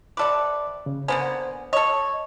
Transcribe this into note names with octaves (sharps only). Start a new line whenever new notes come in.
C3 A4 B4 D5 D6
C#3
D3 A#3 B3 C5 G#5
A4 C#5 D#5